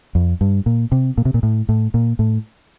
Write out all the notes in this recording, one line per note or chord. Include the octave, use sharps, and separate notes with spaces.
F2
G2
A#2
C3
A#2
C3
A#2
A2
A2
A#2
A2